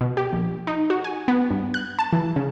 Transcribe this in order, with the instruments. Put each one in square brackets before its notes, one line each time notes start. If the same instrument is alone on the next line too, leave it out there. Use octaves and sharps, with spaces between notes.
[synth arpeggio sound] B2
G4
A#1
D#4
F#4
G#5
B3
G2
F#6
A5
E3
C#3